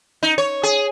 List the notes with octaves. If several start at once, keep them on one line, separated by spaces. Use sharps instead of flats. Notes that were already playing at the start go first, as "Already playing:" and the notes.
D#4
C#5
G#4